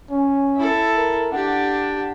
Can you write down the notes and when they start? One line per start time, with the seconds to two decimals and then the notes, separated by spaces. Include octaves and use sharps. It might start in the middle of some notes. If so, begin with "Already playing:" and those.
0.10 C#4
0.57 E4 A4
0.96 A#4
1.32 D4 G4 F#5